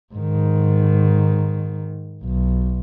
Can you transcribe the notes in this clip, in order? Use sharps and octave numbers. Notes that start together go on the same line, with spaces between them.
G#2 D#3
B1